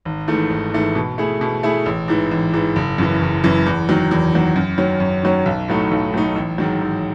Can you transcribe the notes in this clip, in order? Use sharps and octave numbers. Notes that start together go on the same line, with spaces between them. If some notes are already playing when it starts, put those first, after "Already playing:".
G#1
G#2 E3 A3
G#1
G#2 E3 A3
B2
A3 E4 G#4
B2
A3 E4 G#4
A1
G#2 E3
A1
G#2 E3
F#1
F#2 E3
F#1
F#2 E3
E2
D#3 F#3
E2
D#3 F#3
F#2
D#3 F#3 C#4
F#2
D#3 F#3 C#4
B1
A2 F#3 A3 D#4
B1
A2 F#3 A3 D#4
A1
G#2 D#3 F#3
A1